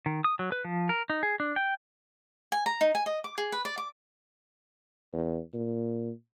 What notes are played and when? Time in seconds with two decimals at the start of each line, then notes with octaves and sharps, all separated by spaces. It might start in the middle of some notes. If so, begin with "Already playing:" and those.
0.06 D#3
0.24 D#6
0.39 F#3
0.52 B4
0.65 F3
0.89 A#4
1.10 D#4
1.23 G#4
1.40 D4
1.56 G5
2.52 G#5
2.66 A#5
2.81 D#4
2.95 G#5
3.06 D#5
3.24 D6
3.38 G#4
3.52 B4
3.65 D5
3.78 D6
5.13 E2
5.54 A#2